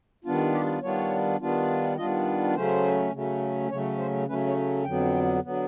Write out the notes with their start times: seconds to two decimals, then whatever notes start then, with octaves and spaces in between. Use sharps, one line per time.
0.25 D#3 G3 B3 D4 F4
0.53 G4
0.82 D#3 G3 B3 D4 F4 C#5
1.40 D#3 G3 B3 D4 F4
1.97 D#3 G3 B3 D4 F4 D#5
2.54 C#3 F#3 A3 C#4 C5
3.12 C#3 F#3 A3 C#4
3.70 C#3 F#3 A3 C#4 C#5
3.98 C5
4.28 C#3 F#3 A3 C#4 B4
4.47 C#5
4.85 F2 D3 F#3 B3 G5
5.44 D3 F#3 B3